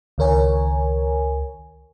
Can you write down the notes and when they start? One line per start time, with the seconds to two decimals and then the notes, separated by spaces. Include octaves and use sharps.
0.18 C#2 D#3 A#4 C#5 G#5